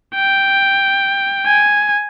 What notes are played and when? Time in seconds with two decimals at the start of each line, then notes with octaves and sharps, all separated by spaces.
0.15 G5
1.46 G#5